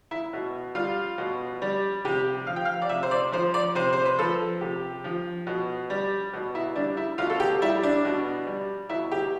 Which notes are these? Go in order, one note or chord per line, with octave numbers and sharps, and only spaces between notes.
E4
B2
G3 F4
B2
G3
C3 G4
F3 F5
G5
F5
D5
C3 E5
C5
D5
F3 C5
D5
C3 C5
C5
B4
F3 A4
C3 G4
F3
B2
G3
B2
E4
G3 D4
E4
B2 F4
A4
G4
G3 E4
D4
B2
G3
B2 E4
G4